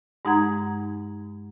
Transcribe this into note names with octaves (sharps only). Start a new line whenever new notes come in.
G2 G#3 D#4 F#5 A#5 G#6